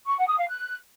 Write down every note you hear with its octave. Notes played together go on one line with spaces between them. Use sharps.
C#6
F#5
D#6
F5
F#6